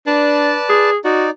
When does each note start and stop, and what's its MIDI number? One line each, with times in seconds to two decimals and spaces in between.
0.07 0.55 62
0.07 0.90 71
0.07 0.90 74
0.07 0.90 81
0.69 0.97 68
1.05 1.30 63
1.05 1.27 66
1.05 1.30 74